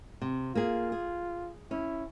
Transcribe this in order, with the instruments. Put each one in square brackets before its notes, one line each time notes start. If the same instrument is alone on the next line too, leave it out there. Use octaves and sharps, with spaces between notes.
[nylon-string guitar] C3
[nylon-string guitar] A#3 G#4 [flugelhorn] F4
[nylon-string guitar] G#4
[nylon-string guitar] C#4 [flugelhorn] E4